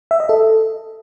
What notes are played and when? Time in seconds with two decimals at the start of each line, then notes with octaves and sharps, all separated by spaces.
0.11 E5
0.20 D#5
0.29 A4